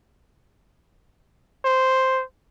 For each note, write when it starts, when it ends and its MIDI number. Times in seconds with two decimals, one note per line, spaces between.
1.65 2.22 72